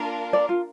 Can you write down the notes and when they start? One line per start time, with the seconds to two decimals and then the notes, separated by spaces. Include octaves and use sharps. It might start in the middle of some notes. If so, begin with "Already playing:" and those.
Already playing: A#3 D4 F4 A#4 F5
0.33 D5
0.49 F4